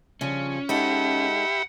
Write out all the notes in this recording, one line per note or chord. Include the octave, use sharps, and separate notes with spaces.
G2 C#3 F3 C#4
G#3 D#4 G4 A4 E5 F#5 B5